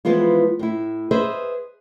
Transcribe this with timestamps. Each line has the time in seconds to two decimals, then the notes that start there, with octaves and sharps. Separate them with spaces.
0.05 E3 F3 G#3 B3 F4
0.59 A2 E4
1.11 G#4 B4 C5 D#5 E5